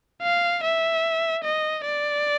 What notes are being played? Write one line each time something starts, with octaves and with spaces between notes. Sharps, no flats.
F5
E5
D#5
D5